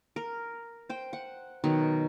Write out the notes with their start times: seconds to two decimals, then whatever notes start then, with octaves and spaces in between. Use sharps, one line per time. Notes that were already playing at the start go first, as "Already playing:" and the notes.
0.16 A#4
0.90 C5 G5
1.13 F#5
1.64 B2 D#3 F#3